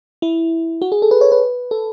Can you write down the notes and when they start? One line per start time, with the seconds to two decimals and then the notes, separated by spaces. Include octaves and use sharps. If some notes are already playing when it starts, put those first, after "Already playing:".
0.22 E4
0.82 F#4
0.92 G#4
1.02 A4
1.11 B4
1.21 C#5
1.32 B4
1.71 A4